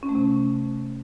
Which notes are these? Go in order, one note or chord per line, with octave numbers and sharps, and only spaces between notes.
C#4
A3
C3